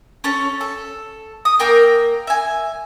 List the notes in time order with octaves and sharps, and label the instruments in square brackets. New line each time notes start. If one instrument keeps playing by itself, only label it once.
[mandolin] C#4 A4 C#5
A4
D#6
A#3 A#4 G5 E6
E5 G#5